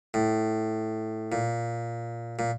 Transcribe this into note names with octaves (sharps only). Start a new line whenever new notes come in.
A2
A#2
A#2